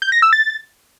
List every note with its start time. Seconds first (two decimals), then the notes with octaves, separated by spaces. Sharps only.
0.02 G6
0.12 A#6
0.22 E6
0.33 A6